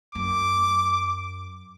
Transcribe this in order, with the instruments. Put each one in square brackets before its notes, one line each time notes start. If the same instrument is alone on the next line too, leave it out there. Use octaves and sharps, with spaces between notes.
[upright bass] F#2 [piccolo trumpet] D6